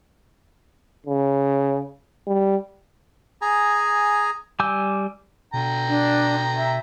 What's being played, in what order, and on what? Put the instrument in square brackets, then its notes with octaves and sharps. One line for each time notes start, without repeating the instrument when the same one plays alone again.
[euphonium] C#3
G3
[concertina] G#4 G#5 A#5
[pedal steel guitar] G3 G#5 D6 E6 G6
[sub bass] B2 [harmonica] D3 G5 A#5
[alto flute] D4
E5